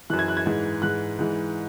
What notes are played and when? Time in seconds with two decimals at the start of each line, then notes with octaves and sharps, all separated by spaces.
0.10 F#2 E3 F#6
0.19 G#6
0.28 F#6
0.37 G#6
0.46 G#2 E3
0.82 G#2 E3 F#6
1.19 G#2 E3